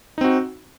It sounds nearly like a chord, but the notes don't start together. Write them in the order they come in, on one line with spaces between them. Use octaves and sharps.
D#4 C4 F#4